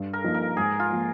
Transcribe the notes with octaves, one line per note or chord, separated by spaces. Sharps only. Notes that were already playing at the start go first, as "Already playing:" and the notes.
Already playing: G2
A#4
F3 A#3 D#4
A#4
G#2 G#4
F4
F3 A#3